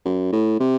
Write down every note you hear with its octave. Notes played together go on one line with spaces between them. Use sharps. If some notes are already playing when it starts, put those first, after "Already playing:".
F#2
A2
C3